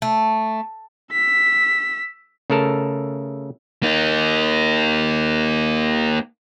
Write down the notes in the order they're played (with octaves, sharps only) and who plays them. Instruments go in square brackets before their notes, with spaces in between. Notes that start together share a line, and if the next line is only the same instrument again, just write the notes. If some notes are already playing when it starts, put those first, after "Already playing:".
[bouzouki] A3
[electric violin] E6 B6
[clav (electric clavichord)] C#3 A3 A4 A#4 A5
[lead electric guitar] A#3 D#4